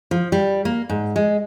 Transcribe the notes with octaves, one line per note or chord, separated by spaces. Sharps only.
F3
G3
A#3
G#2
G#3